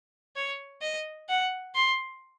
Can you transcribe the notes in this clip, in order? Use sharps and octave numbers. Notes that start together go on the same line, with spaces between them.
C#5
D#5
F#5
C6